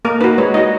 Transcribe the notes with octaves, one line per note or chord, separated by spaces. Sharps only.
A#3 A#4
D#4 F#4 B4
G#3 C#5
D#4 F#4 D#5